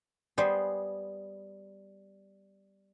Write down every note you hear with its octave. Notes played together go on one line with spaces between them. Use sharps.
G3 B3 G#4 C5